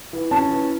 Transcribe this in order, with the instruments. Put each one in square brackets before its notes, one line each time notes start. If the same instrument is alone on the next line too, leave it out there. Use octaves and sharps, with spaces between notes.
[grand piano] E3
[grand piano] C#4 [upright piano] A5
[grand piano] E3